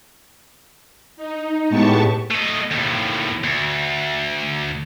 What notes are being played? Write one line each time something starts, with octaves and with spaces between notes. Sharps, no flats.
D#4
A2 G#3 B3 G4 A5 C#6
A3 D#5
D#2 A2
D2